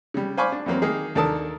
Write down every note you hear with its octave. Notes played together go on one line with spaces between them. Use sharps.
C#3 G3
C5 F5 G#5 B5 C#6 D6
D4
F2 E3 F#3 A#3 C4
D#3 A#3 D#4 G#4
D#2 D4 A4 A#4 A5 D#6